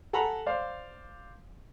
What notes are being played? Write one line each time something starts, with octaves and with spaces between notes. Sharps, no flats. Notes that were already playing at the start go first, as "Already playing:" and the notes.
A4 F#5 G#5 A#5 B5
C5 D5 F5